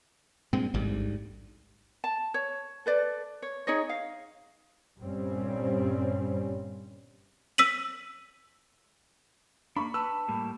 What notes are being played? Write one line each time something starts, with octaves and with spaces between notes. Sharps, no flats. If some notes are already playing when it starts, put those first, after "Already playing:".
G2 A#2 G#3 C4
A1 D2 G#2 G3
A5
C#5
A4 B4 D5
C#5
D#4 G#4 C#5 D#5
F5
G1 G2 A#2 G3 C4 C#4
E6 B6 D#7 F#7
A#3 D4 B5 C#6
B4 A5 E6
A2 G3 A#3